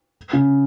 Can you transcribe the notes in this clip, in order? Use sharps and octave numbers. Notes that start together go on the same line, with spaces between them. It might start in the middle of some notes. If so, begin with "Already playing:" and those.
C#3